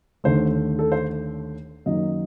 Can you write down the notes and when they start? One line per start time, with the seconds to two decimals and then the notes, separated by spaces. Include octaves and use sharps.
0.24 D#2 D3 A3 C5
0.79 A4
0.92 C5
1.86 F#2 D#3 F#3 A#3 D#5